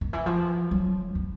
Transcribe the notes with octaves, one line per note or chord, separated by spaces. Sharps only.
D#3
E3
F3
F#3
B3